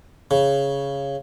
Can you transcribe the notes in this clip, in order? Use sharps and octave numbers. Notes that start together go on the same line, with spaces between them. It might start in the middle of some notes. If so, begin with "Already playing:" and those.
C#3